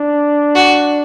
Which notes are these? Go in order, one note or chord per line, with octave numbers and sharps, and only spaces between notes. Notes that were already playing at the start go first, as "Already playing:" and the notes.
Already playing: D4
F#4